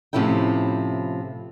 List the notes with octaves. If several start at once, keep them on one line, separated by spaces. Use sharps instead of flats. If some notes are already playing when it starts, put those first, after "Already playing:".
A2 C3 F3 C#4 E4 G5